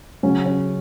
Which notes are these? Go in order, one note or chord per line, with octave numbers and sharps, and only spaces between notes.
C#3 F#3 C#4
C#4